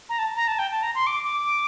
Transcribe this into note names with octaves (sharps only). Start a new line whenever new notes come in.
A#5
A5
A#5
A5
G5
A5
A#5
C6
D6
D6